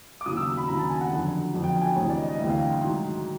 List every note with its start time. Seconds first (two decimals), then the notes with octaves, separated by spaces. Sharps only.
0.21 D6
0.26 D#2 C#3 F#3 D#6
0.37 E6
0.57 B5
0.68 D#2 C#3 F#3 A#5
0.79 A5
0.90 G#5
1.01 F#5
1.11 F2 D3 F#3
1.53 F2 D3 F#3
1.64 G5
1.82 G#5
1.86 G5
1.96 D2 C3 E3 G3 C#5
2.10 D5
2.17 D#5
2.29 D#5
2.39 D2 C3 E3 G3 E5
2.49 F5
2.60 G5
2.71 C6
2.81 G#2 D#3 F#3